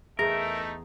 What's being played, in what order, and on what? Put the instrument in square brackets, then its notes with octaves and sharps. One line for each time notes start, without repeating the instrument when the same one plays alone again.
[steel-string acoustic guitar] E2 G#4 A#5 [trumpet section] A3 D#4 E5 [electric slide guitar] A#4